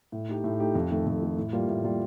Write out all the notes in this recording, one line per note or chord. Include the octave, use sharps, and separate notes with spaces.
A2
A3 D#4 G4
A2
A3 D#4 G4
F2
D#3 A3
F2
D#3 A3
A2
G3 A#3 F4
A2
G3 A#3 F4